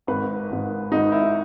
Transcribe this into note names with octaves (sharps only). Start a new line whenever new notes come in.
G#1 G#2 D#3 B4
G#1 G#2 D#3
G#1 G#2 D#3 D#4
E4